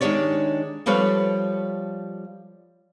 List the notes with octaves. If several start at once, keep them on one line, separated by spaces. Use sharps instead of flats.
D#3 G#3 D4 G4 C#5 D5
F3 G3 A4 B4 C#5 F5